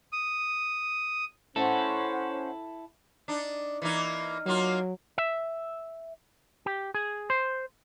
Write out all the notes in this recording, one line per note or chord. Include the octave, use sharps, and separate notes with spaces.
D#6
C#4 E4 A4 C5 F#5
D4 D#4
E3 A#3 D#4
F#3 A#3 D#4 F4
E5
G4
G#4
C5